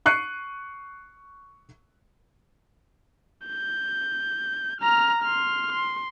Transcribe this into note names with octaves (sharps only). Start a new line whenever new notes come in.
C#6 F#6 C7 C#7 D#7
G6
A#5 F6
C6 F6
C6